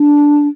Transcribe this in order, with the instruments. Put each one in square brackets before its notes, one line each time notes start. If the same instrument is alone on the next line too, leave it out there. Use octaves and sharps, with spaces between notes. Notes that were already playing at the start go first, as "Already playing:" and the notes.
Already playing: [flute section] D4